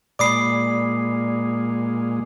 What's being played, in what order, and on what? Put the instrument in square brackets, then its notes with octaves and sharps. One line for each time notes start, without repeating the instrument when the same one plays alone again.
[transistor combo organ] A#2 G#3 [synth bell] D5 B5 [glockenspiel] D6 D#6 C7